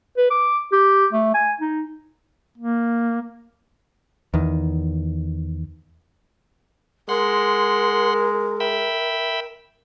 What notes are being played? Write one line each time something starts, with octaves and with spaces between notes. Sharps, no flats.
B4
D6
G4
A3
G#5
D#4
A#3
E2 D#3
G#3 A#4 F#5 C6
E5 G5 B5